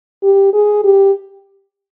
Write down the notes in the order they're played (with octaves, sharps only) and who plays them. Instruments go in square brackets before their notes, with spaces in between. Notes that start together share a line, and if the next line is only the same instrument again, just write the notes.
[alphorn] G4
G#4
G4